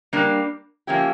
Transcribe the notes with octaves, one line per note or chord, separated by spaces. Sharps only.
G3 A#3 D4
F3 A#3 C#4 E4 G4